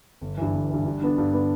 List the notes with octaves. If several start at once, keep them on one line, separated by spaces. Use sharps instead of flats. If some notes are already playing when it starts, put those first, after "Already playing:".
G1
G2 E3
G1
G2 E3
G2
D3 B3 D4
G2
D3 B3 D4